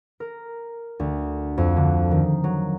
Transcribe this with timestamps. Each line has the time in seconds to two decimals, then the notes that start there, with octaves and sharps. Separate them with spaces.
0.20 A#4
1.00 D2
1.58 F2
1.76 D3
2.11 D#3
2.44 F#3